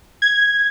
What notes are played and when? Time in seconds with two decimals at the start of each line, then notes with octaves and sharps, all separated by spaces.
0.22 G#6